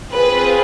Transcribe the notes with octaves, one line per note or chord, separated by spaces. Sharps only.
C4 F4 G#4 B4